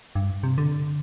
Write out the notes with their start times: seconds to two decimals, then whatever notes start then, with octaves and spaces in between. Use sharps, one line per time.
0.15 G2
0.43 C3
0.58 D3